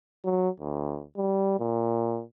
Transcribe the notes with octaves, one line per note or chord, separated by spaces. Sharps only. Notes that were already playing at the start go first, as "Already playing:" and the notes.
F#3
D2
G3
A#2